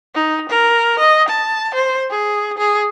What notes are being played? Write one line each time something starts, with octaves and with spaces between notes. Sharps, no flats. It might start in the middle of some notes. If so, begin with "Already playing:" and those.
D#4
A#4
D#5
A5
C5
G#4
G#4